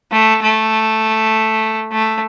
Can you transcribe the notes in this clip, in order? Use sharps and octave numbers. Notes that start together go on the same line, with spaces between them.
A3
A3
A3